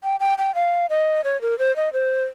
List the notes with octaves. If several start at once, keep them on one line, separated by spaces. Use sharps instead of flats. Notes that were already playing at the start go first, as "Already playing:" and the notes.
G5
G5
G5
F5
D#5
C#5
A#4
C5
D#5
C5